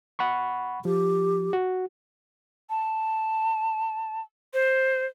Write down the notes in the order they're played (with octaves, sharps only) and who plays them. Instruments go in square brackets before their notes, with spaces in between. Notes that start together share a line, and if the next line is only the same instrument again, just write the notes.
[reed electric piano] F#5 B5 C#6
[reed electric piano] F3 [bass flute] G4
[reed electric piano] F#4
[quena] A5
C5